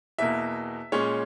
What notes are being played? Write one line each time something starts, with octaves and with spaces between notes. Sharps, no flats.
E2 B2 A#3 E5
A#2 G#3 C#4 C#5